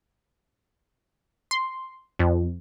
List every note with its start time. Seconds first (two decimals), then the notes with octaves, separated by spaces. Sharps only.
1.51 C6
2.19 F2